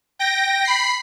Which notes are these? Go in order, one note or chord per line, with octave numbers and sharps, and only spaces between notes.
G5 A#6
B5 C7